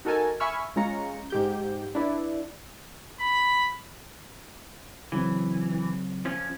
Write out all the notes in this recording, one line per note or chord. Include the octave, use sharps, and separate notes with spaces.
D#4 F#4 A4 A#4 G#5 A5
E5 G#5 B5 C#6 E6 F6
G#3 C#4 F4 A#5 C#7
G#2 G4 G6
D4 E4 B4 D5
B5
C#3 E3 F#3 C4
F3 C#4